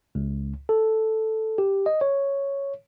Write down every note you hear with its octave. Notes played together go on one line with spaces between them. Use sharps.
C#2
A4
G4
D#5
C#5